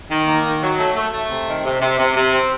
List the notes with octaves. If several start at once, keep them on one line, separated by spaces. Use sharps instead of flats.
D#3
A#3
D#3
F#3
A3
A3
A3
C3
D#3
C3
C3
C3
C3
C4